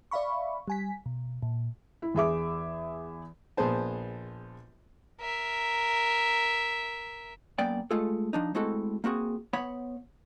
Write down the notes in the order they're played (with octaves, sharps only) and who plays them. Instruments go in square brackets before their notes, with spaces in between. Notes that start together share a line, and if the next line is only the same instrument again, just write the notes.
[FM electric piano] D5 E5 F5 B5 C#6
G3 G#5 B6
B2
A#2
[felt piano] E4
E2 G#4 E5 D6
[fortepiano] A#1 B3 G#4 C5 A5
[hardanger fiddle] A#4 E5
[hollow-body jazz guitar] F#2 A#3 B3 D5 G5
G#3 A3 F4 G#4 A4
F3 D4 D#4
G#3 A3 C4 E4 F#4 A4
A#3 C4 F#4 G#4
B3 C#5 F#5 B5